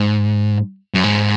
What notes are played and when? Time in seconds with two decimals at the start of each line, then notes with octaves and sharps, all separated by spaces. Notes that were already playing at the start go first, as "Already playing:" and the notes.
Already playing: G#2
0.94 F#2
1.04 G#2